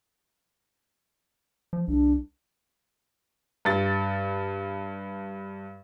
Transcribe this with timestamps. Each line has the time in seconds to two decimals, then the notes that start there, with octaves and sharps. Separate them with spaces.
1.73 F3
1.88 C2 D4
3.65 G2 A6